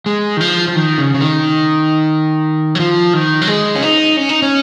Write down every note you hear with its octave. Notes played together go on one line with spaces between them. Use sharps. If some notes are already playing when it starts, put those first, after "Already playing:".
G#3
D#3
F3
F3
D#3
C#3
C#3
D#3
F#3
F3
D#3
F#3
G#3
C#4
D#4
C#4
D#4
C#4